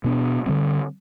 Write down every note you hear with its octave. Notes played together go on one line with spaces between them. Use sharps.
B2 B3 D4
D3 G3 C4